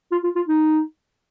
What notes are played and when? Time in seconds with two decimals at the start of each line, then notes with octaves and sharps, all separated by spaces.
0.11 F4
0.24 F4
0.35 F4
0.48 D#4